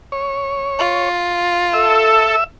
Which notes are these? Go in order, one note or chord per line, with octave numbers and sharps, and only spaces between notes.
C#5
F4
A4 E5